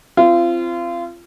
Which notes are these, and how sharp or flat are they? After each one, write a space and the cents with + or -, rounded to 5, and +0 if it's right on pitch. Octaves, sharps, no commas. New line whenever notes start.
C4 +0 F4 -30